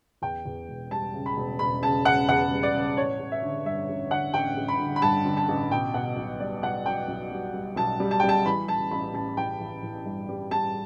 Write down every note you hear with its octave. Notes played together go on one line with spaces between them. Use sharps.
E2 G5
E2
E1
G3 A5
C#3
B5
E1
E1 B5
C#3 A5
C#3 F#5
E2 F#5
G3
D5
C#3
A1 C#5
A1
E5
D3
G2 E5
A1
D3 F#5
A1 G5
A1
B5
D3
B5
G2 A5
D3
A5
A1
B2 G5
B2 F#5
B1
G3 D5
B1 F#5
B1 G5
B1
G3
G3
B1 A5
G3
A5
G3 G5
A5
E3 B5
E3 A5
A1 B5
A1 A5
E3 G5
E3
E3
G2
G3
G3 A5